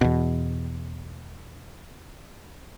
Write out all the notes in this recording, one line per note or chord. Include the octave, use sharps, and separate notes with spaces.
E2 B2